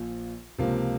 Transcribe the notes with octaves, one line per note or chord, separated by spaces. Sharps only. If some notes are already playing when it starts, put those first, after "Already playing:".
Already playing: A#1 A#2 F3
C#2 C3 F3 A#3